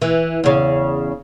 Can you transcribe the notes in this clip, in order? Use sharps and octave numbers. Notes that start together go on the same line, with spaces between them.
E3
E2 C#3